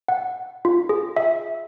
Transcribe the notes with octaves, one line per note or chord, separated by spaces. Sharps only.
F#5
F4
G#4
E5